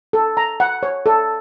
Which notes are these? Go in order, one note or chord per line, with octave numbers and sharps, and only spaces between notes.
A4
A#5
F#5
C#5
A4